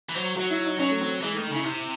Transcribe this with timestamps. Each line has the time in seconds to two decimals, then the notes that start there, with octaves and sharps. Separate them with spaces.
0.10 E3
0.15 F#3 C5
0.36 F#3 F#4
0.50 E4
0.65 D#4
0.79 F#3 C#4
0.90 A3
1.01 C4
1.22 E3 G#3
1.33 D#3 A3
1.44 D#4
1.51 C#3 E4
1.65 C3 E4